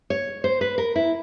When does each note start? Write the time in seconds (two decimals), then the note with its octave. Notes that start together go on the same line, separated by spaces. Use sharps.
0.10 C#5
0.44 C5
0.61 B4
0.78 A#4
0.96 E4